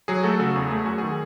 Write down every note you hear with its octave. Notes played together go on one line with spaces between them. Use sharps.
F#3 G#4
A3 F#4 A4
C#3 F#4 A4
E2 G#4
A3 G#4
F#2 F#4
D#3 G#4